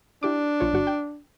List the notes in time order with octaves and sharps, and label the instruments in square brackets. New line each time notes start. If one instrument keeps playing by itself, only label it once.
[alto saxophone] D4 [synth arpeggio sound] E4 G4 D6
[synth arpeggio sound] B1 F4 C#5
G1 F#4
G5